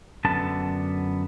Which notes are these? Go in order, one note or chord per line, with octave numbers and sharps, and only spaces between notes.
F#2 D3 B3 A5